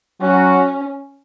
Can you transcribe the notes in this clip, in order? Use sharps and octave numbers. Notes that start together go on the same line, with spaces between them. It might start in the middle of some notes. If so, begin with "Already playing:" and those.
F#3 C#4 F#4